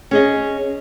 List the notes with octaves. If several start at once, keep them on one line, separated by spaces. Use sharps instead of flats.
C#4 G#4 D#5